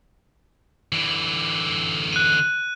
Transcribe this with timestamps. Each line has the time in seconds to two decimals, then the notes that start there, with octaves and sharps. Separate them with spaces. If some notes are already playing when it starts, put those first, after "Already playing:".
0.92 D3 E3
2.13 F#6 D#7